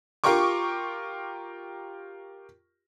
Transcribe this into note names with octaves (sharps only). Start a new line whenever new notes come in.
F4 G4 A#4 C#6 D6